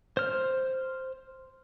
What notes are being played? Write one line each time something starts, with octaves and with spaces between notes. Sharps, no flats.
C5 F6